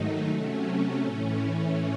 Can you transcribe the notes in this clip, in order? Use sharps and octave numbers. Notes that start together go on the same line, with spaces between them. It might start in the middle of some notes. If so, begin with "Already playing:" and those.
Already playing: G#2 D#3 F#3 A3 D#4
C3 F#3 A3 C#4
A2 E3 A3